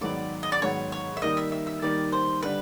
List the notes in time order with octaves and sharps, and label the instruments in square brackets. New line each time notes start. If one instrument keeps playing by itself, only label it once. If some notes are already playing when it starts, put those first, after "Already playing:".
[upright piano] G#2 D#3 F#3 B3 [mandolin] D5
[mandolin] D#5
D5
[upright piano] G#2 D#3 F#3 B3 [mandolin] C#5
[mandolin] C#5
E5
[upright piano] D#3 G3 A#3 D#4 [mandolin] D#5
[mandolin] E5
E5
E5
[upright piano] D#3 G3 A#3 D#4 [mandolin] D5
[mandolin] C5
[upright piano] D3 G3 [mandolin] B4